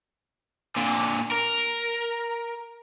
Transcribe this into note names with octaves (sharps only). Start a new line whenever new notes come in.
A#2 D3
A#4